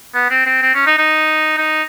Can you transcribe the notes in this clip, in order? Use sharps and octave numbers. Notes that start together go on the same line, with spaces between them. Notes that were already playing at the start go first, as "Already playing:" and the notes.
B3
C4
C4
C4
C#4
D#4
D#4
D#4